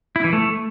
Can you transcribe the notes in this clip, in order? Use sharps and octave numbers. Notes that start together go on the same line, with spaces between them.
E4
E3
A3